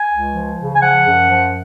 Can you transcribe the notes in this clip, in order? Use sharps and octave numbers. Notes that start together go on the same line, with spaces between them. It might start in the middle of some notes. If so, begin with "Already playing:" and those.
Already playing: G#5
C#2
F3
C#3
G#5
F3 F#5
F#2
F3